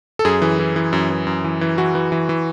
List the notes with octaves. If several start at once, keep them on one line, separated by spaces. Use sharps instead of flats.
A4
F#2 G#4
E3
E3
E3
F#2
E3
F#2
E3
E3
E3 F#4
E3
E3
E3